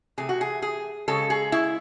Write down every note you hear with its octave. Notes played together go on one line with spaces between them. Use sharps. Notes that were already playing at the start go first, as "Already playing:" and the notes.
C3 E3 A3 G#4
F#4
G#4
G#4
C#3 G#3 A4
G#4
E4